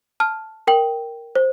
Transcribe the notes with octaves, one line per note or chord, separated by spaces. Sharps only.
A5 F6
A#4 G5 F#7
C5